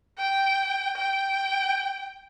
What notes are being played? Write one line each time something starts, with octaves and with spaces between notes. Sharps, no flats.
G5
G5